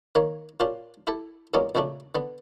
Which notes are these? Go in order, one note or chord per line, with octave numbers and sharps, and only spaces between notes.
D#3 A#3 C#5
A#2 C#4 D4 F4 G4
E4 G4 A4
E2 G2 F#3 G#3 A#3 C#4
A#1 F2 C#3 A3 D4
D3 B3